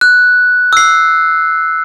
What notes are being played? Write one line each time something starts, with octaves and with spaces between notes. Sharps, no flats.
F#6
E6 C7